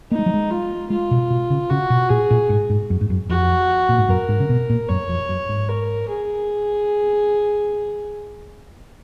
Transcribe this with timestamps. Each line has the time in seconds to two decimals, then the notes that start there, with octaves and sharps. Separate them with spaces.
0.11 A#3 D#4
0.19 G#3
0.26 F#3
0.34 G#3
0.51 F4
0.90 G#3 F4
1.11 B2
1.30 B2
1.50 C#3
1.70 C#3 F#4
1.90 B2
2.09 A#2 G#4
2.31 A#2
2.49 G#2
2.70 G#2
2.90 F#2
3.01 G#2
3.10 F#2
3.29 F2 F#4
3.89 A#2
3.98 G#2
4.09 F#2 A#4
4.29 G#2
4.40 C#3
4.49 B2
4.70 A#2
4.89 F#2 C#5
5.09 F2
5.29 F#2
5.49 G#2
5.69 A#4
6.08 G#4